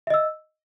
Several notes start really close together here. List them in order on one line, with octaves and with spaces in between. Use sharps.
E5 D#5 E6